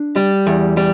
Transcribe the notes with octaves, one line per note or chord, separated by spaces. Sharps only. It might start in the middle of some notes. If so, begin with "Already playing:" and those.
Already playing: D4
G3
E2
G3